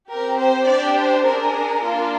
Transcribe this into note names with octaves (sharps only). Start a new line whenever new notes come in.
C4 G4 A#4
C5
D4 G4 D5
C5
D4 G#4 A#4
A#3 D4 F4